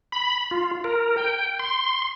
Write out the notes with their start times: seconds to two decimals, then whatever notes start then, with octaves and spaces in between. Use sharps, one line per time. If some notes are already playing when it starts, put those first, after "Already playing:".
0.12 B5
0.51 F4
0.84 A#4
1.17 G5
1.60 C6